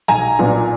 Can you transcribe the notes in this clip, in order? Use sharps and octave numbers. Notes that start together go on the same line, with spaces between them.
B1 G#5 A#5
A#2 F#3 B3 D4